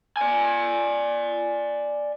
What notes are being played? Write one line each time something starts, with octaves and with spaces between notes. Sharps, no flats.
D5 G#5